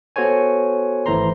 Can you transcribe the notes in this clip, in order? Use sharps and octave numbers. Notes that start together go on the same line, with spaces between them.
B3 F#4 A4 C5 C#5 G#5
G#1 E3 A3 C5 A#5 C6